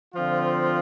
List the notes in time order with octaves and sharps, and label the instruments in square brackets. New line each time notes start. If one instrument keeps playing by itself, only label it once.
[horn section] D3 F3 C4 F4